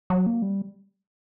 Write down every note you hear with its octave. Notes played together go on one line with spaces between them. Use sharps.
F#3
A#3
G3